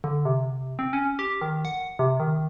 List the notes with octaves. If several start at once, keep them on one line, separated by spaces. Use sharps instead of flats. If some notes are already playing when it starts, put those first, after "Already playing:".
D3
C3
C4
C#4
G4
D#3
F#5
C3
D#3